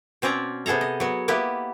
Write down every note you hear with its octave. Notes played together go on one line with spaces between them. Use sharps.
B2 C4 C#4 D5 A#5
C3 B3 G#4 A4 A#5
D#5
F#3 B3
A#3 B3 E4 G4 B4